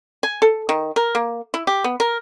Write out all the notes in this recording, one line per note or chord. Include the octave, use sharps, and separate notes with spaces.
G#5
A4
D#3
A#4
A#3
E4
G4
B3
A#4